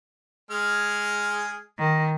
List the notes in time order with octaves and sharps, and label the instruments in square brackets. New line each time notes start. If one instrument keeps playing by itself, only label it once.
[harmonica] G#3 G#4 F6
[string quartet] D#3